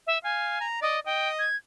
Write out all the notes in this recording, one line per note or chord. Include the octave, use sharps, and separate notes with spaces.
E5
F5 G#5
A#5
D5 D#5
D#5 G5
G#6